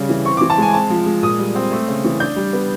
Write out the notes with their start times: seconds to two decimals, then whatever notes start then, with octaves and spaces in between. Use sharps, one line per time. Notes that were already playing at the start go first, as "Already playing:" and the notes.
Already playing: C#3 G3
0.09 E3
0.25 C4 C#6
0.37 D6
0.41 E3
0.50 A5
0.58 G#3 G#5
0.74 C4 A5
0.90 F3
1.06 G#3
1.23 A#2 D#6
1.39 G3
1.55 C4
1.72 A3
1.88 C#3
2.04 E3
2.20 D4 G6
2.36 G3
2.53 B3